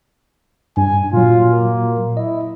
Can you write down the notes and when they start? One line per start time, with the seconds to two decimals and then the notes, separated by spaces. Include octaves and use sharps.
0.77 G2 G#5
1.13 A#2 F#3 F4
1.50 A#3
2.17 E4 D#5